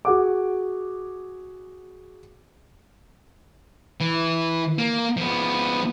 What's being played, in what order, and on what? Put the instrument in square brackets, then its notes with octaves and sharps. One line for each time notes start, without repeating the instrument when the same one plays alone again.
[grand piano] F#4 G#4 F#5 D6
[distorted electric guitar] E3
A#3
F3 B3